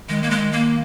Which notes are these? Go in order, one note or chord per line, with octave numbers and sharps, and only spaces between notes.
D#3 G#3
A#3
G#3
A#3